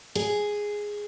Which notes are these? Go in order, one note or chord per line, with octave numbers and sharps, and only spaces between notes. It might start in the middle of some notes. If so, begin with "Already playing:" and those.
G#4